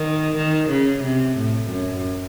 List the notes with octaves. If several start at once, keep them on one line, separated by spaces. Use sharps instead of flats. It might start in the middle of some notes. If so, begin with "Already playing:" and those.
Already playing: D#3
D#3
C#3
C3
A2
F#2